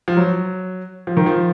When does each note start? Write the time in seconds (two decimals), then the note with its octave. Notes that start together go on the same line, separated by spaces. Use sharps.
0.08 F3
0.17 F#3
1.07 F3
1.17 D#3
1.26 F3